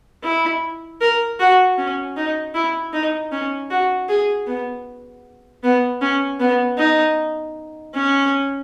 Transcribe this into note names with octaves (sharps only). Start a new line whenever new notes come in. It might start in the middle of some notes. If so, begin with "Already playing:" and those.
E4
A#4
F#4
C#4
D#4
E4
D#4
C#4
F#4
G#4
B3
B3
C#4
B3
D#4
C#4